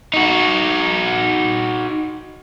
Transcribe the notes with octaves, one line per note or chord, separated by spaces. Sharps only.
D#4 F#4